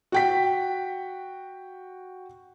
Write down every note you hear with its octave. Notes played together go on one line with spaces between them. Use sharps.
F#4 G5 B6